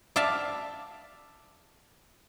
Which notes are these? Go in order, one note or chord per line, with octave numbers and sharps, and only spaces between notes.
D5 E5 F5 A5